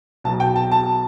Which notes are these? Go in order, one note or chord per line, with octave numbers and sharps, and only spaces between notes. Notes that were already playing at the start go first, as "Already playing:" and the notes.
B1 B2 A5
G5
A5
A5